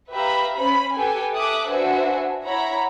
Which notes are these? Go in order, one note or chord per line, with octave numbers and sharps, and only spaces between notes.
G4 B4 E5 F5 A#5 B5
C#4 C5 B5
G4 A4 B4 G5 G#5
A4 E5 D6 D#6 F#6
D4 F#4 B4 C5 E5 G#5
E4 C#5 F#5 A#5 B5